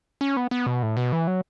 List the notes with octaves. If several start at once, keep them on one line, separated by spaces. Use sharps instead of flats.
C#4
B3
B3
B2
A2
B2
E3
F#3